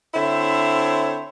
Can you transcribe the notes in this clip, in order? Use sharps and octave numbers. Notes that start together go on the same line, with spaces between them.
D3 C4 E4 C5 C#5 E5